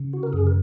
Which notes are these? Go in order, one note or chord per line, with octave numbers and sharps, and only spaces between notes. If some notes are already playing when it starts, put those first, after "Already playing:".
Already playing: C#3
F#4
A#4
F#2 G#4
A#4